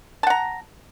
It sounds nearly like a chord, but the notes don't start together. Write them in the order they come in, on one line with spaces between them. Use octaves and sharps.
A5 F#5 A#5